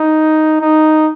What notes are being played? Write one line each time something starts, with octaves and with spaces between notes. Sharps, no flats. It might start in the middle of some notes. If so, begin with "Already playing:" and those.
Already playing: D#4
D#4